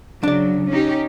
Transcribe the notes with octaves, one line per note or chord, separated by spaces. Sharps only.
C#3 F#3 D4 D5
C#4 D#4 G4